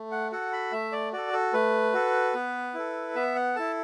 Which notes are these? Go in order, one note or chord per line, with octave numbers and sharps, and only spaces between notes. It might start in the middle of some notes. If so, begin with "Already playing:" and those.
Already playing: A3
F#5
F#4 A4 F#5
B5
A3 E5
D5
F#4 A4 D5
A4
A3 B4
F#4 A4
B3
E4 A4
B3 E5
F#5
E4 A4 A5